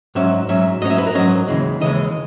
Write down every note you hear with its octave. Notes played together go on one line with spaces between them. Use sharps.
G#2 F#3 C#4 E5
G#2 F#3 C#4 E5
G#2 F#3 C#4 D#5
E5
B4
A#4
G#2 F#3 C#4 D#5
D#2 C#3 E3 G#3
D#2 C#3 E3 G#3 D#5